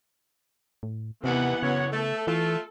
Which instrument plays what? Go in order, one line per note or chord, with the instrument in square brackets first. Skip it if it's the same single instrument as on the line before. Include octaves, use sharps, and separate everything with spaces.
[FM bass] A2
[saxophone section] D#2 D#3 [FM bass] C3 [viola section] E3 B3 F#5
[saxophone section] F#2 C#5 [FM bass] C#3
[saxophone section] A3 [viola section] A4
[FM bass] E3 [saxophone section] A3 F4